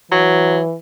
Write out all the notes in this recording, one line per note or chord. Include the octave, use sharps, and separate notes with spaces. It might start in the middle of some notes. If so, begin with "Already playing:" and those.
E3 F#3